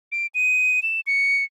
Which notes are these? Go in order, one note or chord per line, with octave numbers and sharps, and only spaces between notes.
D7
D#7
E7
C#7